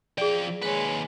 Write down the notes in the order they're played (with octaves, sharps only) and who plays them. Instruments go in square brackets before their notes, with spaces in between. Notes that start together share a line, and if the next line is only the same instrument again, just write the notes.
[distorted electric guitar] F3 G5 [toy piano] G#4 D5
[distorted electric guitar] D#2 B4 [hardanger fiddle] G#3 C#5